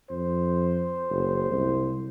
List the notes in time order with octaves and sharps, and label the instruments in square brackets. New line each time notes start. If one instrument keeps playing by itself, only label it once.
[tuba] F2 [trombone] C5
[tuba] F#1
C2